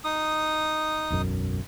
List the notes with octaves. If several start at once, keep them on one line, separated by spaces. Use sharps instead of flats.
D#4 D#6
E1 B1 F#2